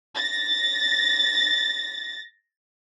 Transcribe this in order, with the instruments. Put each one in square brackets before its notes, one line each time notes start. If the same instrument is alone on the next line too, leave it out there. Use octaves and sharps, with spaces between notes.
[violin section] A6 A#6